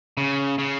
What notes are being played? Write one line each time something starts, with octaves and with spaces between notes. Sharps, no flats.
C#3
C#3